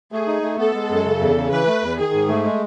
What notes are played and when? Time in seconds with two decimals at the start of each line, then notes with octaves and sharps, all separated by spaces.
0.12 A3 G#4
0.27 D#4
0.42 A3
0.58 B3 A4
0.74 G#3
0.90 F#2
1.05 C#3
1.21 E2
1.36 C#3
1.51 E3 B4
1.67 A3
1.82 E2
1.97 D#3 G#4
2.13 G#2
2.28 A3
2.44 G#3